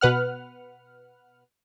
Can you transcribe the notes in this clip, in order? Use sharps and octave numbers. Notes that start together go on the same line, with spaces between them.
B2 B4 F#5 F6